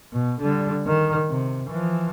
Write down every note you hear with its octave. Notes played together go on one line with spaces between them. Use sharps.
B2
D3 G3
D#3
C3
E3 F3